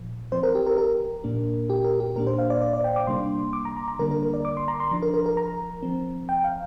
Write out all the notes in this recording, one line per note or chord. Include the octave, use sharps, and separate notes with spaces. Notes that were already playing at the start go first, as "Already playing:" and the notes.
Already playing: A#2 F3
F3 C4 C5
A#4
G4
A#4
A#4
A#2 A#3 D4
G4
A#4
G4
A#2 A#3 D4 A#4
C5
F5
D5
D5
D5
G5
D6
C3 G3 A#3 D4 C6
D6
A#5
A#5
A#5
D3 G3 A#3 D4 A#4
A#4
A#4
D5
D6
C6
A#5
C6
F3 D4
A#4
A#4
A#4
A#5
F3 C4
G5
F5